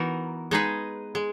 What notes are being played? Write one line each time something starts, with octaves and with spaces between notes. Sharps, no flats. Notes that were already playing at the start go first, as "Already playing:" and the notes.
Already playing: E3 B3 D#4 F#4 A#4
G#3 D#4 G#4 B4
G#3